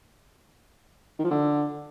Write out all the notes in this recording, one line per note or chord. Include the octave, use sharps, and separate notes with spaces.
D#3
F3
D3